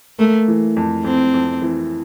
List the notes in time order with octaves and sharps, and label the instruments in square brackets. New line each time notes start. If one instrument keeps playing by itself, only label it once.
[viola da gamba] A3 [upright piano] A#3
[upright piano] E3
F2
[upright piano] F2 [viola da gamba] C4
[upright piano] F2
E3